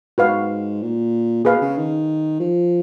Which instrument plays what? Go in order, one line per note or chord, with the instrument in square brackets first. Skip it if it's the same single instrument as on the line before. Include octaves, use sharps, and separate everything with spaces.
[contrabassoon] G#2 [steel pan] F#4 B4 F5
[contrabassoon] A#2
[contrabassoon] A#2 [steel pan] G#4 B4 F5
[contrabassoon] B2
C#3
D#3
F3